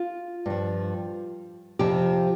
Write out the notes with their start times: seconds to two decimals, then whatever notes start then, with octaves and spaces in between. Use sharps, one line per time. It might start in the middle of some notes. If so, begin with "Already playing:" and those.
Already playing: F4
0.46 G2 F3
1.79 F2 C3 F3 G4